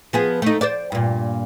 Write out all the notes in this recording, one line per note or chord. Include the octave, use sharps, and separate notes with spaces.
F3 B3 G#4
A3 D#4
C5 D5
G2 A#2